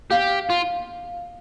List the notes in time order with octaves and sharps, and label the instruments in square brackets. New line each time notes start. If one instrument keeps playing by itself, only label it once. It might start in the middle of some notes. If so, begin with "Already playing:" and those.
[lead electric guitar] G4 [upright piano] F5
[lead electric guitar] F4